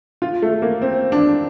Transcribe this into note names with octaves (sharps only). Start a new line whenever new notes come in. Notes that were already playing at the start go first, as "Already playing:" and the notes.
F4
A3
A#3
C4
D4